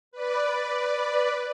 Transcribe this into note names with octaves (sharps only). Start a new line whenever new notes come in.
B4 D5